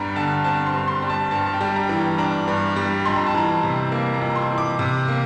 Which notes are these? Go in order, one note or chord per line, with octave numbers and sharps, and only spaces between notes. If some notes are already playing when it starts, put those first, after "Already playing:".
Already playing: G2 G3 A#5
D3 A5
C4 A5
C6
G2
C6
G3
A5
G2 A5
A5
G5
G3
A#5
E3
G5
D4 A#5
G2
G3
F2 C6
A#5
A5
E3 A#5
C3
A#3
A#5
F2
A#5
C6
E3
D6
C3
A#3